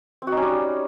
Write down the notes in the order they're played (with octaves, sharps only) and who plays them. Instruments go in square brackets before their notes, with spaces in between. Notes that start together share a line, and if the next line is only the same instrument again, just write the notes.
[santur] C4
F#4
D#4
C#4
G3